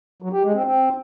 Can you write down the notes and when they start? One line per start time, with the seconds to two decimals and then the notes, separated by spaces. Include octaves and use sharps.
0.22 F#3
0.33 G4
0.43 G#3
0.54 C4
0.64 C4